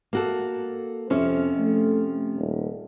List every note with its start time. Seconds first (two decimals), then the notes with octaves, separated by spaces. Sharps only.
0.13 A#3 F#4 A4
1.10 F2 C3 F3 C#4
1.59 A3
2.37 D#1